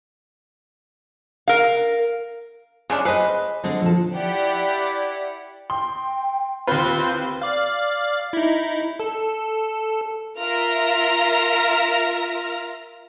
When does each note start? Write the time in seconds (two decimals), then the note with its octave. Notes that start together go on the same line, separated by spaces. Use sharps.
1.48 A#4 F5
2.90 C#3 G#3 C#4 D4
3.05 G#4 B4 C5 D#5
3.64 D3 G#3 C4
3.81 A#2 F3 A4
4.15 E4 G4 D5 F#5
5.70 G5 C6
6.67 D#2 C4 E4 F4 B4 C5 G6
7.42 D5 F5
8.33 D#4 E4
9.00 A4
10.40 F4 A#4 E5 F6 A#6